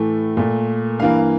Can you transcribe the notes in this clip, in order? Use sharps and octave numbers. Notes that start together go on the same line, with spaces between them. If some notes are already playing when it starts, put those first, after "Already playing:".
Already playing: A2 E3 A3
A#2 A3
G2 E3 A#3 F5